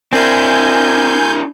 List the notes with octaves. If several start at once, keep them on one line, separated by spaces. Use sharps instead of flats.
C4 D4 E4 A#4 G#5 G6